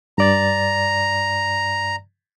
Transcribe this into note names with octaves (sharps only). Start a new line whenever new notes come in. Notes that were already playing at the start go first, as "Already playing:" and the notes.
G2 D5 A#5 A6